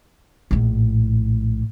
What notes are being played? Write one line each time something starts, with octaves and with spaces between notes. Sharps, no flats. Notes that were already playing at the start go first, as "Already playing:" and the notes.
A#1 A2